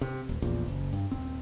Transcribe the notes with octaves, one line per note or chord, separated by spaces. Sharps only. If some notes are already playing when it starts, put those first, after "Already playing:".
C3
D#1
A#1 E2 A#2
F#1
G2
D#1 C4